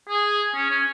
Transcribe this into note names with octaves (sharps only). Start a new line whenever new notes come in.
G#4
C#4
C#4